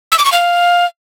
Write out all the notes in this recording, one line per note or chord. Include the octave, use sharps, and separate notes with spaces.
E6
D6
C#6
F5